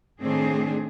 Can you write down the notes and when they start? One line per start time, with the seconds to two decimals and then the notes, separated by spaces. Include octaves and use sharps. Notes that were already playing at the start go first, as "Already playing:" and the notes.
0.21 A2 D#3 A3 C4 D4 G#4